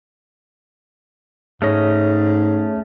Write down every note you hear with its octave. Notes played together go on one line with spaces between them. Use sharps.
G#2 A3 C#4 G#4 C#5 D#5